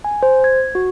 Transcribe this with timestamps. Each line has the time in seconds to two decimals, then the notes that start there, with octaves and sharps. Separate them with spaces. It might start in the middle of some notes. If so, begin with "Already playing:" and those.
0.04 G#5
0.23 C5
0.44 G#6
0.75 F#4